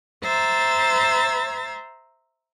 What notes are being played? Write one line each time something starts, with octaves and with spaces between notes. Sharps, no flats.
C5 E5 A#5 A6